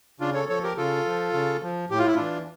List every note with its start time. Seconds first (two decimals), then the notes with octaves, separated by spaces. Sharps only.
0.20 C#3 D4 F4
0.34 A4 C#5
0.49 F3 A4 C#5
0.63 G4 A#4
0.77 C#3 F4 A4
1.06 F3
1.34 C#3
1.63 F3
1.90 A2 G4
1.99 F4
2.07 E4
2.15 E3 D4 F4